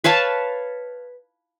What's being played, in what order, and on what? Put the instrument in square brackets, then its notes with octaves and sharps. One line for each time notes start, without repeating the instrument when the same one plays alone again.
[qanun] B4 C#5 F5 A5